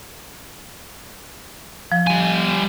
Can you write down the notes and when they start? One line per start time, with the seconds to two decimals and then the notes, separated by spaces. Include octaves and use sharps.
1.92 F3
2.07 G3 G#5